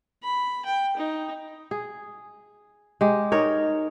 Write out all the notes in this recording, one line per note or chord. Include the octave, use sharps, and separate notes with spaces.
B5
G5
D#4
G#4
G#3 G4
D#4 A#4 C#5